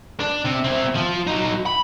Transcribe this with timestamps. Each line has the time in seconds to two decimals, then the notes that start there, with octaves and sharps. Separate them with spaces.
0.20 D4
0.45 C3
0.64 C4 E4
0.95 F3
1.27 F#3 D#4
1.66 B5